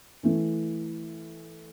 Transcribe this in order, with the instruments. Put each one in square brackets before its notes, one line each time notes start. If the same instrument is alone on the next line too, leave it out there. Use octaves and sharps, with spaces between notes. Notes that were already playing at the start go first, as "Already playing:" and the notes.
[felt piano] E3 A3 E4